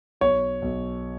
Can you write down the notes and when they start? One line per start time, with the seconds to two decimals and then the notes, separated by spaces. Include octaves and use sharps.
0.21 B1 C#5
0.62 B1